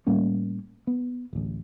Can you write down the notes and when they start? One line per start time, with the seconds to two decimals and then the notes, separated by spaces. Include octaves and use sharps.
0.07 A2 G3 A#3 C#4
0.87 B3
1.33 D1 A1